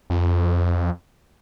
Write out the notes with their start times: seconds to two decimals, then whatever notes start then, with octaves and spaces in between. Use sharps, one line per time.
0.10 F2